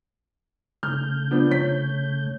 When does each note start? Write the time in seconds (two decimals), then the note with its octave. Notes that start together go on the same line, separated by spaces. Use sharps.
0.83 C#3 A3 F6 G6
1.31 F3 B3 D4
1.51 C#5 B6